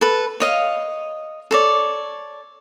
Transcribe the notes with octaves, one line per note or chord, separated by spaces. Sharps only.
A4 B4
C#5 D#5 F5
A4 C#5 D5